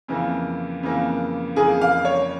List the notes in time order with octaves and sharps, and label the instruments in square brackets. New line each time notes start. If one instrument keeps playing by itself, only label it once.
[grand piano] F2 C#3 E3 A#3
F2 C#3 E3 A#3
[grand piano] F2 C#3 E3 A#3 [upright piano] G#4
[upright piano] F5
C#5